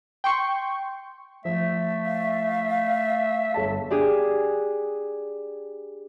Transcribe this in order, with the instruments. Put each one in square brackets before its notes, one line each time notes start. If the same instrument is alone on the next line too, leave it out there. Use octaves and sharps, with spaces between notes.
[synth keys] G5 C6 C#6
[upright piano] F3 [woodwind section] A3 [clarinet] E5
[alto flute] F5
[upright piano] G1 C#5 A5
[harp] D4 G4 G#4